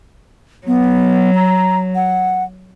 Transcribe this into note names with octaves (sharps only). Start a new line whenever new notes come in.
F#3 B3
A#5
F#5